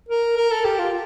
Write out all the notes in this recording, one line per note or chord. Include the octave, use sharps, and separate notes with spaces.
A#4
A#4
A4
G4
F4